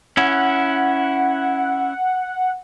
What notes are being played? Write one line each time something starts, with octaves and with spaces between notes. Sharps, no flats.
C#4 E4 F#5